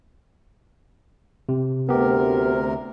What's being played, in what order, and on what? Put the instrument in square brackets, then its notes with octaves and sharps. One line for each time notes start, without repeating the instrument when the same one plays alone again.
[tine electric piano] C3
[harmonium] D2 C3 A#4 [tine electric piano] B3 G4